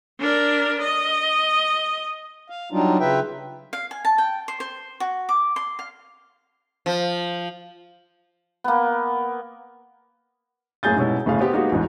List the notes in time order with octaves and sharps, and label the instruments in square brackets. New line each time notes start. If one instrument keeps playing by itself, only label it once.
[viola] D4 A#4
D#5
[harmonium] F5
F#3 G3 D4 D#4 F4
C#3 F4 B4 E5 G5
[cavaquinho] F5
G#5
A5
G5
C5
C5
F#4
D6
C6
F5
[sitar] F3
[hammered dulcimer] A#3 B3
[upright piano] F#2 A2 A#3 G#4 G6 A6
G#2 B2 G3 G#3 C#4 E4
G1 A2 C#3 G#4 F5
B3 C4 G4
G#3 A#3 B3 D#4 F#4 G4
A1 E2 G#2